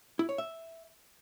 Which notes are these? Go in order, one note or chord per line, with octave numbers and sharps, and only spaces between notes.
E4
C#5
E5